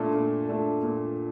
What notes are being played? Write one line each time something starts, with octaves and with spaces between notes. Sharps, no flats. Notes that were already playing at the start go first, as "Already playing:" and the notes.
Already playing: A#2 A3 D4 A4 D5
A#2
A3 D4 A4 D5
A#2